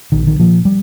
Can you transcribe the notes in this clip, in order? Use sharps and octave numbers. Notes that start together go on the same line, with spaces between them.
A#1 D#3
D#3
A#2 F3
G3